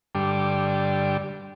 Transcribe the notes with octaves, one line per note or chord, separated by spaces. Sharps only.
G2 D3 G3